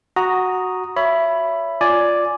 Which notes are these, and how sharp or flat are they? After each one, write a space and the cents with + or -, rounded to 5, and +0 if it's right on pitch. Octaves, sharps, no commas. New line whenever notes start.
F#4 +0 A#5 +0 D#6 +0
C#5 +20 E5 +20 B5 +0
F4 +0 D5 +0 G#5 +10